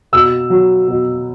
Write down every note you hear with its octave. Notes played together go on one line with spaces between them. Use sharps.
B2 E6
F#3
B2